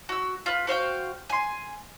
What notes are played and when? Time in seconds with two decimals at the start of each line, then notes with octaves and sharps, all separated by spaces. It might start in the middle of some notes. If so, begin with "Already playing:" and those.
0.09 F#4 E6
0.46 F4 B4
0.67 F#4 C5 F5 G5
1.30 G#5 C6